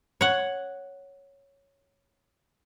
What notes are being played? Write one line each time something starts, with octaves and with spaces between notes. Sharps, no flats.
C#5 F#5